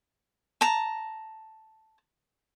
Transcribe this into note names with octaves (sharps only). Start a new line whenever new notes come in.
A5 A#5